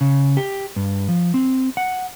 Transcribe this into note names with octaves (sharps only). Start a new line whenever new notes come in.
C#3
G4
G2
F3
C4
F#5